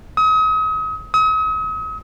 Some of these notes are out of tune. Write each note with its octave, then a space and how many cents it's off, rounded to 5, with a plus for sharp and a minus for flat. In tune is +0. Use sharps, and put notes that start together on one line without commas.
D#6 +40
D#6 +45